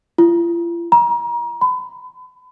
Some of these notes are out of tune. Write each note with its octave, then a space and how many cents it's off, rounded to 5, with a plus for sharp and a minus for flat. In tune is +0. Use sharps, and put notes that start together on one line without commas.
F4 -45
A#5 +35
B5 +35